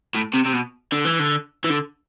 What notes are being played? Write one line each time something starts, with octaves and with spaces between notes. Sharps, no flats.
A2
C3
C3
B2
D3
E3
D3
E3
D3